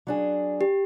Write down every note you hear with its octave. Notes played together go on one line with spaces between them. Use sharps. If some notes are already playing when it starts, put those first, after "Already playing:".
F#3 D4 G#4
G4